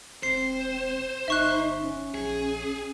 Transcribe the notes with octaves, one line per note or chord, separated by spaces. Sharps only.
E1 C4 C5 C7
G1 D#4 E5 C#6 F#6
C#4
A#1 G#4